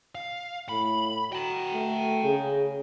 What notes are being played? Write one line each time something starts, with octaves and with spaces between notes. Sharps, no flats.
F5
A2 B5
F#4 G5 A#5
A3
C#3 G#4